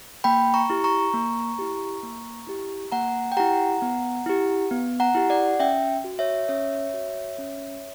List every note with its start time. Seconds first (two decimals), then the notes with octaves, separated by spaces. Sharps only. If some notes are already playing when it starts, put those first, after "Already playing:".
0.24 A#3 G5 B5
0.54 A#5 C#6
0.70 E4 G4
0.84 A#5 C#6
1.14 A#3
1.58 E4 G4
2.03 A#3
2.47 E4 G4
2.92 A#3 F#5 A#5
3.32 G5
3.37 E4 G4 F#5 A#5
3.82 B3
4.26 E4 G4
4.71 B3
5.00 F#5 A#5
5.15 E4 G4
5.30 D5 F#5
5.60 C#4 E5 G5
6.04 F#4
6.19 C#5 E5
6.48 C#4 C#5 E5
6.94 F#4
7.39 C#4